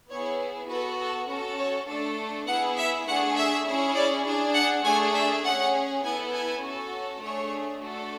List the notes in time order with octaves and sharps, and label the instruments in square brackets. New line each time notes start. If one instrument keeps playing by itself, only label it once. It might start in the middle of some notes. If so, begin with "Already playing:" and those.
[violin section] B3 E4 G#4 C#5
B3 F#4 A4 B4
A4
C#4 F#4 A4 B4
C#5
A3 D4 A4 D5
B3 E4 G#4 F#5
E5
A3 D4 G#4 F#5
E5
C#4 E4 G#4
D5
D4 G#4
F#5
A3 D4 G#4 G#5
E5
C#4 G#4 F#5
B3 E4 A4 G#5
G#5
C#4 F#4 A4
A3 D4 G#4 C#5
A3 D4 F#4 A4